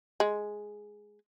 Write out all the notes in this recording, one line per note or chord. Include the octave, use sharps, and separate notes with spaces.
G#3